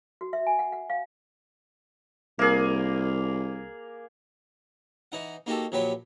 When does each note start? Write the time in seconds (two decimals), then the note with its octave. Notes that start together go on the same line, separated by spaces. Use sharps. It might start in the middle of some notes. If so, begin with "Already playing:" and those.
0.21 F#4
0.33 E5
0.47 G#5
0.59 F#5
0.72 F#5
0.90 F5
2.39 C2 A#3 G#4
5.12 E3 D#4 F#5
5.46 A#3 D#4 F#4 G4 A4
5.72 A#1 F#3 G4 B4 C#5 G5